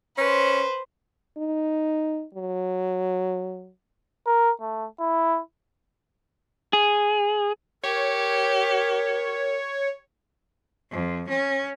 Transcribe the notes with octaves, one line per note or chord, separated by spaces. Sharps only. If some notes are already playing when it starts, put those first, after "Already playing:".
C#4 B4 C5
D#4
F#3
A#4
A3
E4
G#4
G4 A#4 C#5
F2
C#4